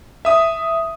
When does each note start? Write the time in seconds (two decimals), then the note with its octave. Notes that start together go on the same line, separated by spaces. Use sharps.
0.25 E5 D#6